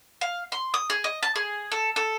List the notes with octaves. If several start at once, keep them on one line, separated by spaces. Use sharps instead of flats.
F5
C6
D#6
G#4
D#5
A5
G#4
A4
A4